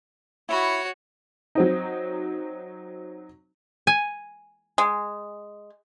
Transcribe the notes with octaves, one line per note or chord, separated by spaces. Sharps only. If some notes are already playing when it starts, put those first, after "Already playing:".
E4 F#4 C#5 B5
F#3 C4 D#4
G#5
G#3